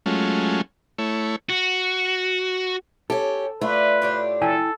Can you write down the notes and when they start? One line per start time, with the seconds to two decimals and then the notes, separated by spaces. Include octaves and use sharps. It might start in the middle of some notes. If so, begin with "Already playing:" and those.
0.06 F#3 G#3 A3 C#4 F4
0.98 A3 E4 C#5
1.50 F#4
3.10 C#4 G4 A4
3.61 A3 D4 F4 B4
4.02 A2 D4 G4
4.41 E4 A4 G5 G#5